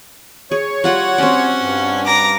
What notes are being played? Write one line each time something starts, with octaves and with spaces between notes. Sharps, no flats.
G#4 C#5
G3 F4 F#4 F#5 B5
C4 C#4 D5
G2
A#5 D6